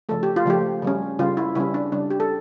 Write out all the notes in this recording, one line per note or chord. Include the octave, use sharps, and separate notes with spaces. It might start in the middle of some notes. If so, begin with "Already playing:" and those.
C#3 F3 A3 A4
G4
F4
C#3 F3 A3 G4
C#3 G3 C#4
C#3 G3 C#4 F4
E4
C#3 G3 C#4 E4
D4
C#3 G3 C#4 D4
G4
A4